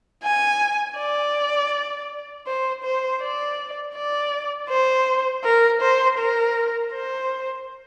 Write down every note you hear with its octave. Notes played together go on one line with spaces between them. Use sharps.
G#5
D5
C5
C5
D5
D5
C5
A#4
C5
A#4
C5